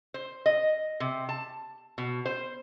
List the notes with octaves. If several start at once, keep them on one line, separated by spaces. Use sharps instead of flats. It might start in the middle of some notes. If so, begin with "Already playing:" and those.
C5
D#5
C3
A5
B2
C5